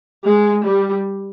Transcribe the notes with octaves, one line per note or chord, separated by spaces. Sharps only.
G#3
G3